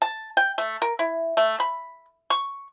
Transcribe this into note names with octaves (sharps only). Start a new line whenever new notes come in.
A5
G5
A3
A#4
E4
A3
B5
C#6